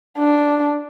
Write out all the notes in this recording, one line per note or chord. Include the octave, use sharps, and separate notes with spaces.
D4